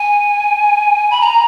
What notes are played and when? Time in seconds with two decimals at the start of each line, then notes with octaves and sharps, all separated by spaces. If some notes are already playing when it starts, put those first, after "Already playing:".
Already playing: G#5
1.11 B5
1.21 A#5